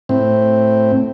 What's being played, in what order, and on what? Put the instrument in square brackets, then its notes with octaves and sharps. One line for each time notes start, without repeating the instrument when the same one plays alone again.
[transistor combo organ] A2 C4